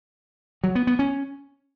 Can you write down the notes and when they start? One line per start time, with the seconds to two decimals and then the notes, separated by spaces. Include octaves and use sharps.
0.64 F#3
0.75 B3
0.87 B3
0.99 C#4